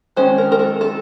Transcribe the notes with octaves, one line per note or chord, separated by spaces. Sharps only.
D#3 G#3 C#4 C5
A#4
A#4
A4
A4